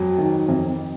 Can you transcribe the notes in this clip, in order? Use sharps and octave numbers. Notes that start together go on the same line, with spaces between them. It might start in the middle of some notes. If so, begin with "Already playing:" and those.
Already playing: F2 F#3
D#3
F2